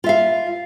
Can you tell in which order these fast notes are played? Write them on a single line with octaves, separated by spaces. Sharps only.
F4 E5 F5